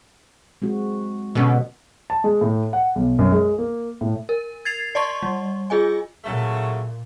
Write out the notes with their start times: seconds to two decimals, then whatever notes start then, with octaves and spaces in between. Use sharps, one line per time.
0.62 G#3 C4 F#4
1.35 B2 D3 B3 C#4
2.10 A5
2.24 G#3
2.41 A2
2.73 F#5
2.96 B1
3.19 F#2
3.32 G#3
3.58 A#3
4.01 A2
4.29 A#4
4.65 G#6 A6 C7 F7
4.95 D5 D#5 A5 C6 C#6
5.23 G3
5.70 F4 G#4 D#5 G#5
6.25 A#2 C#3 F#3 A3